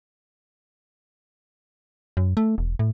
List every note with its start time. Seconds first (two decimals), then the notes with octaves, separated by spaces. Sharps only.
2.17 F#2
2.37 A3
2.58 E1
2.79 A2